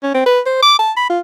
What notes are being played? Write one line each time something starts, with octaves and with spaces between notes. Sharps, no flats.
C#4
C4
B4
C5
D6
A5
B5
F4